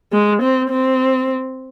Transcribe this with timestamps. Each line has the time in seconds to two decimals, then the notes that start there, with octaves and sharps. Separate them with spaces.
0.13 G#3
0.42 C4
0.70 C4